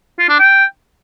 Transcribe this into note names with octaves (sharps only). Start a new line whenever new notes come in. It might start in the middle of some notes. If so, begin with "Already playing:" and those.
F4
D4
G5